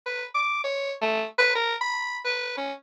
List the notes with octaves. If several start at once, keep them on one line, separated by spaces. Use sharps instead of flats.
B4
D6
C#5
A3
B4
A#4
B5
B4
C#4